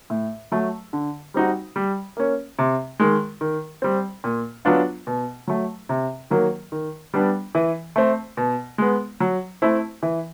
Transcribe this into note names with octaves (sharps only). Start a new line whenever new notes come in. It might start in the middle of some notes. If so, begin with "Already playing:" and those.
A2
F#3 A3
D3
G3 C4 D#4 F#4
G3
A#3 C#4
C3
D#3 G#3
D#3
G3 C4
A#2
F#3 B3 D4 F4
B2
F#3 A3
C3
D#3 F#3 A#3
D#3
G3 B3 D4
E3
A3 C4
B2
G#3 B3
F#3
A3 C4 E4
E3